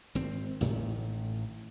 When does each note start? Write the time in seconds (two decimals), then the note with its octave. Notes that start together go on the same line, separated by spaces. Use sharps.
0.15 G#1 C4
0.61 A1 A2 D#3